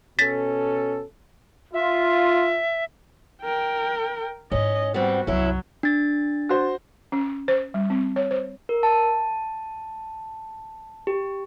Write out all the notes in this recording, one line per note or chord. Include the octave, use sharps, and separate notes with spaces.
B2 C#4 A4 A6 B6
F4 E5
A#4 G5
G#2 C#4 E4 D#5
G3 B3 C4 F#4
C2 F#2 F#3 C#4 E4
D4 A6
F#4 C5
C#4
C5
G3
C4
C#5
C5
A#4
A5
G4